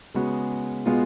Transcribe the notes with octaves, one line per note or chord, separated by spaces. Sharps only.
C#3 G#3 B3 F#4
B2 G#3 B3 F4